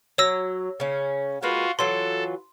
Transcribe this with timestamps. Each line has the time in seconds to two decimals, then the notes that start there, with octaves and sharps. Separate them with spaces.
0.18 F#3 C#5 E6 A#6
0.80 C#3 C#4
1.42 G#3 A#3 F4 F#4 B4
1.79 E3 F#3 F4 A4 C6